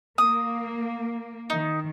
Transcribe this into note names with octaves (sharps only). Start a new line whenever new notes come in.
A#3 D#6
D#3 D#4